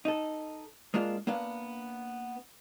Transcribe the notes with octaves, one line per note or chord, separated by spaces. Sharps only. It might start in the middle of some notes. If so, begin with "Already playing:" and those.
D#4 A4
G#3 A#3 D4 F4
A#3 B3 D4 F5